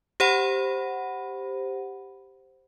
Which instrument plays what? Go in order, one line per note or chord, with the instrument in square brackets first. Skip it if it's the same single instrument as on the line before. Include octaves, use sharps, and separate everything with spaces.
[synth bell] G4 C5 F#5 B5